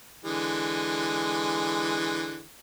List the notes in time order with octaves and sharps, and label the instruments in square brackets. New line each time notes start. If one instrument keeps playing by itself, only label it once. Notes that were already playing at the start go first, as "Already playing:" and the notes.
[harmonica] D3 E3 G#3